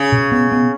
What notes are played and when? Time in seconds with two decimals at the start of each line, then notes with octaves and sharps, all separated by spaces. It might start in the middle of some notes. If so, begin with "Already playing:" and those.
Already playing: C#3
0.12 B2
0.32 B3
0.52 B3